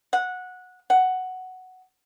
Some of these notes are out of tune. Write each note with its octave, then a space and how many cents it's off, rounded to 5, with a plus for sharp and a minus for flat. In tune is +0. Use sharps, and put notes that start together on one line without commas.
F#5 -15
F#5 +5